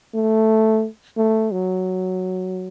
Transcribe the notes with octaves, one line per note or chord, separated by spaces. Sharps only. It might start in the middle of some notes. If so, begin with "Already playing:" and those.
A3
A3
F#3